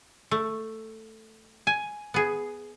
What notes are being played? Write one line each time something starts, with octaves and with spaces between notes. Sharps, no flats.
A3
G#5
B3 G#4